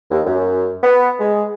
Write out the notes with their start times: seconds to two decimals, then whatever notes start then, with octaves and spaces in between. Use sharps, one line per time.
0.11 D#2
0.25 F#2
0.83 B3
1.19 G#3